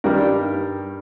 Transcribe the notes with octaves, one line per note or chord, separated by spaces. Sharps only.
G2 D#3 G3 A#4